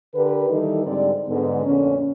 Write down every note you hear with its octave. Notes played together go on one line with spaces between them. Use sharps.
D3 G4 A#4 B4
D#3 E3 G3 D#4 A4
G#2 D3 G3 C4 D5
G#2 D3 B3
F2 A#2 D3 C#4